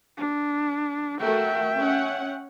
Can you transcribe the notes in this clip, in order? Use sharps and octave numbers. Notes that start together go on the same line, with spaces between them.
D4
A3 F#4 A#4 E5 G5
C#4 F#5